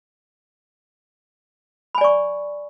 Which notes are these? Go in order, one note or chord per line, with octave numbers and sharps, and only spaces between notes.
D5 G#5 B5 C#6